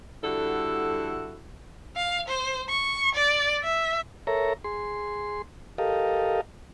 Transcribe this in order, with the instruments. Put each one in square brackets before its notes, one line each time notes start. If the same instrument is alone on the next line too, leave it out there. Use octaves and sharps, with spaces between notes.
[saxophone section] D3 G3 E4 F#4 A4
[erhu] F5
C5
C#6
D5
E5
[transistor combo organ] A4 A#4 C#5 E5 A#5
G#4 C6
G4 A4 A#4 D#5 F5